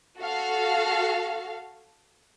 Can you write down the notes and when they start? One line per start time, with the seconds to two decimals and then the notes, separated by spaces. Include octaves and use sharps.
0.19 F#4 A4 F5